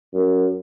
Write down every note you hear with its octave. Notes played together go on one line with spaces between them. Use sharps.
F#2